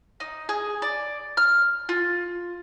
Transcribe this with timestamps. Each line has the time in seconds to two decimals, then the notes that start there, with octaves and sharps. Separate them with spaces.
0.20 D#4
0.49 G#4
0.82 D5
1.37 F6
1.89 F4